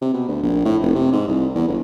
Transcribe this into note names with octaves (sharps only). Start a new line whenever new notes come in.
C3
B2
D2
A#1
A2
F1
C3
G#2
C2
E2
G1